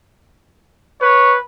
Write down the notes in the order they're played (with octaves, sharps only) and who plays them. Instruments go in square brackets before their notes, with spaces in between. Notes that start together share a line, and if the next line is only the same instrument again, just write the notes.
[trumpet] B4 [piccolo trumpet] C#5